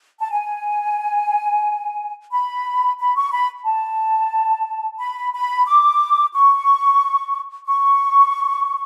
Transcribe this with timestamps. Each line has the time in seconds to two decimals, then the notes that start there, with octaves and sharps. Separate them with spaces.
0.20 A5
0.31 G#5
2.31 B5
2.99 B5
3.15 C#6
3.32 B5
3.65 A5
5.00 B5
5.34 B5
5.66 D6
6.34 C#6
7.67 C#6